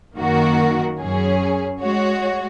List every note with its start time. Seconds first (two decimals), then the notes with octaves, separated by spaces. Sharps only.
0.16 F#2 D#3 A#3 F#4 A#4
0.97 F#2 F#3 C#4 G#4
1.80 G#3 F#4 C#5